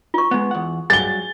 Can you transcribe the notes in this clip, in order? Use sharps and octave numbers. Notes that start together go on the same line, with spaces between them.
F4 C#6
G#3 B3
E2 F#5
G2 F#3 G#4 G#5 A6 G7